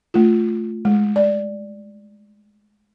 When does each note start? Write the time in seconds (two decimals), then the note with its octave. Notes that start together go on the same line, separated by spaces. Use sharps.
0.14 A3 F4
0.85 G#3
1.16 D5